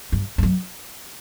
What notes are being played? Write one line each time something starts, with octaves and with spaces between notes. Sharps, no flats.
G2
G2
F#2